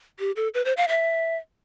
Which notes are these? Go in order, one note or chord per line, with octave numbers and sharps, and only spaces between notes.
G4
A4
B4
C5
F5
E5